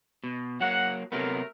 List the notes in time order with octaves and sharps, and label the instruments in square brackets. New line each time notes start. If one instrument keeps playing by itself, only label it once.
[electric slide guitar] B2
[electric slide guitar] F#3 A#3 [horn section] F#5
[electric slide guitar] C3 F#3 B3 [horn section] A3 A#4